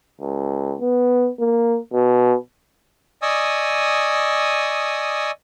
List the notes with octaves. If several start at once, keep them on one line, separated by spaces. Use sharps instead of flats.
C#2
B3
A#3
B2
D5 D#5 G#5 C#6 D#6 E6